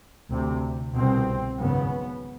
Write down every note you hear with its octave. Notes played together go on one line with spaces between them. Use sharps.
D2 C3
C2 B2 C4
G#1 F#2 C#3 B3